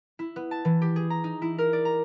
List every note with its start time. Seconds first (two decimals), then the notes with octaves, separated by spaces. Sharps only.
0.19 E4
0.36 B3
0.51 A5
0.65 E3
0.82 G4
0.96 G#4
1.10 A#5
1.24 D#4
1.42 E4
1.58 A#4
1.73 D5
1.85 A#5